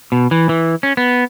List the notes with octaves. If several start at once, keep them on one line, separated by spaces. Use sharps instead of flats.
B2
E3
E3
C#4
B3